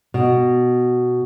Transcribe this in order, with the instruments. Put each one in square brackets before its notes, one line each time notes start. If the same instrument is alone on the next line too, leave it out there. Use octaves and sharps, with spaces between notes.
[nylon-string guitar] B2